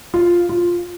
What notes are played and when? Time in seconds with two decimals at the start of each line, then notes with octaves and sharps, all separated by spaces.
0.14 F4
0.49 F4